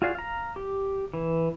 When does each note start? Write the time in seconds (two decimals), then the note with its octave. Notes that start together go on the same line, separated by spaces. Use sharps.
0.02 F4 F#4 G#4 D5 F5
0.15 F5 A#5
0.56 G4
1.14 E3